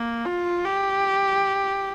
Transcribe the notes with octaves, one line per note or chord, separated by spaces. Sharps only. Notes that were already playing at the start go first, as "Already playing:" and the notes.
Already playing: A#3
F4
G4